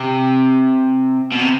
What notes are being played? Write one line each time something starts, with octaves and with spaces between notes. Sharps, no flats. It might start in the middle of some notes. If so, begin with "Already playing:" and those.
Already playing: C3
B2
C3